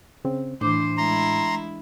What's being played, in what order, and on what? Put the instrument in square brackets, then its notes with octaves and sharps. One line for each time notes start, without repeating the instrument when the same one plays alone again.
[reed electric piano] C#3 C4
[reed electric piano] A2 [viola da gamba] E3 C5 [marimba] D4 D6
[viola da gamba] G#3 E4 [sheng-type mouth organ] A#5 C6